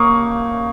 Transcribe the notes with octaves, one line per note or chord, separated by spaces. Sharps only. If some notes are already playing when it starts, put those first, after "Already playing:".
Already playing: A#3 C#6 D#6